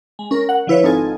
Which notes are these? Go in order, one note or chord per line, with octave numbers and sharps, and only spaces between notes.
G#3
C#4 A#4
F#5
D3 F3 E4 B4 C#5
G#1 C4 D#4 F4 A4 G#5